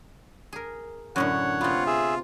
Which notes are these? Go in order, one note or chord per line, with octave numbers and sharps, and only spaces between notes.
G#4 A#4
F#2 A2 D3 C#5 F#5
C3 B3 F4
G#4 E5